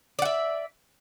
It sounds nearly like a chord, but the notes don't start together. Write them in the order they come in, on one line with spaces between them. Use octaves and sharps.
D5 F#5 E5